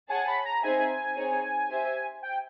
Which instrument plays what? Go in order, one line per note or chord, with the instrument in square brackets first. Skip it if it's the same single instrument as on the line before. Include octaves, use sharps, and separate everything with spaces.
[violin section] G#4 C#5 F#5 A5 [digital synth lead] G#5
[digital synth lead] B5
A#5
[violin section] C4 D#4 G#4 C5 E5 [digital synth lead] G#5
[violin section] C4 D#4 G#4 C#5
G4 C5 E5
[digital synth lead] G5